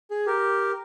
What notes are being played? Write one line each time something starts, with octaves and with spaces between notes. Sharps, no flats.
G#4
G4 A#4